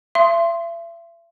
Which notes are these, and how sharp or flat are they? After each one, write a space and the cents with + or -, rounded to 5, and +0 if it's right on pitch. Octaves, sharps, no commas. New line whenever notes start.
E5 +40 C6 +5